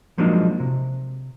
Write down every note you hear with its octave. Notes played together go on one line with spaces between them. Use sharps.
F3 F#3 G#3 A#3 D4 D#4
C3